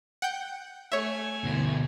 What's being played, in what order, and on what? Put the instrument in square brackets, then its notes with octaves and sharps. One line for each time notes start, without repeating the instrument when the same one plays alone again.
[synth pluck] F#5 G5 G6
[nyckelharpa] A3 G#5 [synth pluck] C#5 E5
[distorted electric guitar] D2 B2